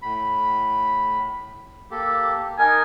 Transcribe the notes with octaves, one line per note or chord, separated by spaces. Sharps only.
A2 B5
A#3 G4 A4
D#4 A#4 G#5